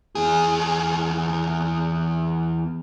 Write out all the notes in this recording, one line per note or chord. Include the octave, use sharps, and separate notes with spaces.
E2 G#4